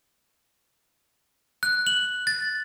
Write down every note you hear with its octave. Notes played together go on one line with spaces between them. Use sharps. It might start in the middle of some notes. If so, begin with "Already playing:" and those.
F#6
F#7
A6